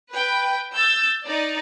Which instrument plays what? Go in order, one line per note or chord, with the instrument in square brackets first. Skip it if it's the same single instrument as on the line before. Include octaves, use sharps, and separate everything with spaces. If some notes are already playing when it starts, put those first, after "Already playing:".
[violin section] B4 G5
E6 G6 A6
D#4 D5